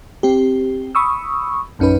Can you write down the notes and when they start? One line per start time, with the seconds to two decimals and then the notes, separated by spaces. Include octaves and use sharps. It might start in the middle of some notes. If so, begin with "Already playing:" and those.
0.23 C4 G4
0.95 B5 C#6 D#6 E6
1.79 A#1 F#2 C#4 D#4 B4